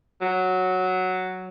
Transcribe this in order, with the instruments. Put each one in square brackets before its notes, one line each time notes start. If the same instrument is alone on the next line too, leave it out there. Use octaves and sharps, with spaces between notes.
[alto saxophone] F#3